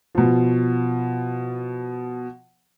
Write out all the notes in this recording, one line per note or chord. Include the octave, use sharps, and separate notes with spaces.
B2 F3